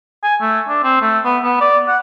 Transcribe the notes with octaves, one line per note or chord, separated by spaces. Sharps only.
G#5
A3
D4
C4
A3
B3
B3
D5
F#5